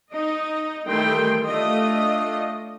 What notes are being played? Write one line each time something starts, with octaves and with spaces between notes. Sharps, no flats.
D#4 D#5
D#3 E3 G3 A3 G5 C6
A3 D4 F4 D#5